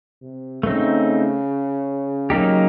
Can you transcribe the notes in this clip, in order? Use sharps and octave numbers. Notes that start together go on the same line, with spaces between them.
C3
C#3 A3 C4 D#4
F#3 A#3 D#4 G4